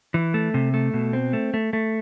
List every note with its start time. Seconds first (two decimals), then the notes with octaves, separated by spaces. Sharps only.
0.14 E3
0.34 A3
0.54 C3
0.74 A3
0.94 B2
1.13 C4
1.33 A3
1.54 A3
1.73 A3